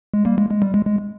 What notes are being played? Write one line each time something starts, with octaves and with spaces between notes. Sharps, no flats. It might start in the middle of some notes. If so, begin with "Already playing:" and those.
G#3
G3 A#3
G#3
G#3
G3
G#3
G#3